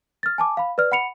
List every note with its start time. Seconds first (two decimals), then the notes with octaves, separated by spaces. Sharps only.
0.23 F6 A6
0.38 G#5 A5 D6
0.57 F5 B5
0.78 B4 D5 F6
0.92 F#5 B5 C#7 F7